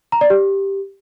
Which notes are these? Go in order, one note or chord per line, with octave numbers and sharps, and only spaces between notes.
A#5
D5
G4